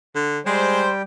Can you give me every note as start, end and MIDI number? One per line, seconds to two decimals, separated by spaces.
0.15 0.39 50
0.46 1.02 55
0.46 0.84 56
0.46 0.90 72
0.46 1.02 79